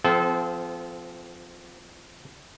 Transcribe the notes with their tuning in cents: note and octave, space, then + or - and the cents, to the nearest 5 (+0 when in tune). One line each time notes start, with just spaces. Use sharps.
F3 +0 C4 -30 A4 -30